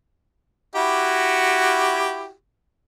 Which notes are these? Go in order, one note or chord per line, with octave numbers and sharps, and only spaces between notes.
E4 F#4 G4